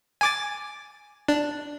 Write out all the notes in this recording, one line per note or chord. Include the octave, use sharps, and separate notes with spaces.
G#5 D6 A6
D4